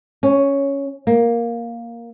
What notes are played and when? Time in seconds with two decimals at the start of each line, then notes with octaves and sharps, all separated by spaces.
0.23 C#4
1.07 A#3